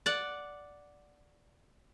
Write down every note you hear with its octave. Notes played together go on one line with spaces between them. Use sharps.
D5 F#5